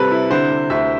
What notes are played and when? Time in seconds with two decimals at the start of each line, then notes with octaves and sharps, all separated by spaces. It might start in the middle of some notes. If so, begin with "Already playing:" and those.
Already playing: C3 G3 C4 A4 B4
0.11 E4
0.31 D3 C5
0.50 D3
0.70 D2 E5